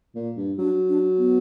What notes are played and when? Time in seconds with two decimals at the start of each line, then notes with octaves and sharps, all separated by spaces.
0.15 A#2
0.37 G2
0.59 F#3 D4
0.89 D4
1.18 B3